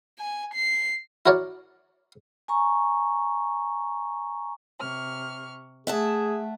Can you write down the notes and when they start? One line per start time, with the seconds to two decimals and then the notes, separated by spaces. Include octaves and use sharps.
0.18 G#5
0.54 C7
1.26 E4 F#4 A#4 C#5 D5
2.48 G#5 A#5 C#6
4.79 C3 C#6 F6
5.87 A3 G#4 E5 F#5 A5